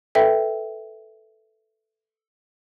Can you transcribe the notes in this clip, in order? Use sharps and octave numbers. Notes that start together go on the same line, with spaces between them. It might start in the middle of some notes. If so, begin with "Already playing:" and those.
A4 B4 E5 G5